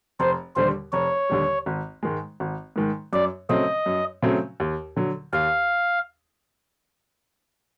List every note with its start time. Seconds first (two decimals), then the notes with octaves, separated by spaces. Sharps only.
0.20 F1 C5
0.56 D#2 D3 G3 C5
0.92 F1 C#5
1.29 D#2 D3 G3
1.66 G#1
2.03 G#2 D#3 G#3
2.40 G#1
2.76 G#2 D#3 G#3
3.13 F#2 D5
3.49 C#3 F#3 A3 C4 D#5
3.86 F#2
4.23 C#3 F#3 A3 C4
4.60 D#2
4.96 D3 F#3
5.33 D#2 F5